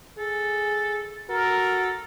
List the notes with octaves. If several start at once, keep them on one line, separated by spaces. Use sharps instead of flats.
G#4 A4
F#4 A4 A#4